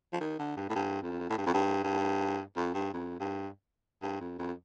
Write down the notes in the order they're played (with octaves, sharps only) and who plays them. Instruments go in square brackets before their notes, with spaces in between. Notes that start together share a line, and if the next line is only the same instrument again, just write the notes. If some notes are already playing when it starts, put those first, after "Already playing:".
[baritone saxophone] F3
D#3
D3
G2
A2
G2
F2
A2
G2
F2
G2
G2
F2
G2
F2
G2
G2
F2
F2